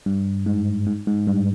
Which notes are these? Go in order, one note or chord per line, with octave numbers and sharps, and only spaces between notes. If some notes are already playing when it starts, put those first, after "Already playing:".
G2
G#2
G#2
G#2
G2